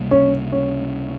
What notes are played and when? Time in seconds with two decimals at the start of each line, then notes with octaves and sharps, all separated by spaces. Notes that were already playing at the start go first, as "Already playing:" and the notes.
Already playing: C#2 C3 G3 A#3
0.11 C#4
0.52 C#4